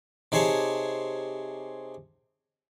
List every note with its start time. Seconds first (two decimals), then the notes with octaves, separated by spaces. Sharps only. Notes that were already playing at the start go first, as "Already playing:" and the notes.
0.32 C3 D#4 G#4 C5 C#5 A5